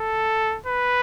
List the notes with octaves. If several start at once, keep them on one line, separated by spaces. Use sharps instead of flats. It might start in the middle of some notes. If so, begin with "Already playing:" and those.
Already playing: A4
B4